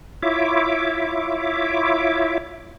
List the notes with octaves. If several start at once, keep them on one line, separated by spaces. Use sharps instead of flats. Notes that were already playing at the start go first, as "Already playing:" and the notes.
E4 F4 C#5 E5 D6